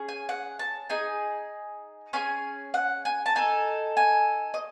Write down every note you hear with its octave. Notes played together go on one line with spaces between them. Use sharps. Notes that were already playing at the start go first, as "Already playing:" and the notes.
Already playing: C#4 G#4
G#5
F#5
A5
D#4 G#4 G#5
C#4 G#4 G#5
F#5
G#5
A5
D#4 A4 G#5
G#5
D#5